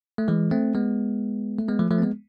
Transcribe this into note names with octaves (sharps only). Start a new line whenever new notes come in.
A3
E3 G#3
A3 C4
G#3 B3
A3
G#3 B3
F3 A3
F3 A3
C4
G#3 B3